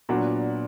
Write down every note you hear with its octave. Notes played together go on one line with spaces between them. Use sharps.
A#2 F#3 B3 D4 F#4